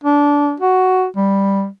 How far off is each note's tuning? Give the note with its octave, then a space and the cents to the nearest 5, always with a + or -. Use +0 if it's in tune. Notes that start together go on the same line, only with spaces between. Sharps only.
D4 -20
F#4 +5
G3 +5